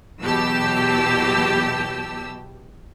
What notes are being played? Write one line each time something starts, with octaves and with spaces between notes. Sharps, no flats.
E2 B2 F#3 G4 A5 E6